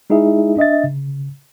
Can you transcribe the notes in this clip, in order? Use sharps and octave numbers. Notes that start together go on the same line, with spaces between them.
G#3 D#4 E4 G#4 E5
D4 D#5 E5 A6
C#3